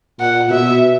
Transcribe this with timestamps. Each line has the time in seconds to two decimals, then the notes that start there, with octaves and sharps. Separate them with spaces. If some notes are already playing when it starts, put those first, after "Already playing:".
0.20 A#2 F#5
0.50 B2 E5